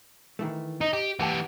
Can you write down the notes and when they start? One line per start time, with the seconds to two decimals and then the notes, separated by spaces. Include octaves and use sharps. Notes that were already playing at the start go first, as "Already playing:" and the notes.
0.39 D#3 E3 A3
0.81 D#4 D#5
0.93 G4
1.19 E3 G4 F#5 G5 A5